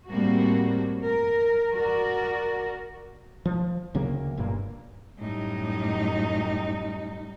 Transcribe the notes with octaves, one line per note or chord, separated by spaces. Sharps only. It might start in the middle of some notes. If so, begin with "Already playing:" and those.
A2 G3 A3 A#3 C4 F#4
A#4
F#4 A#4 D5
F3
D2 C#3 F#3 A#3
F#1 G2 A#2 A#3
F#2 A2 G3 D#4